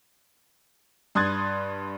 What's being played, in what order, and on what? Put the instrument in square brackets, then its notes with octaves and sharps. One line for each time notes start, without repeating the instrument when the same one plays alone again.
[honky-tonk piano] G2 C6 D#6 F#6 G#6 A6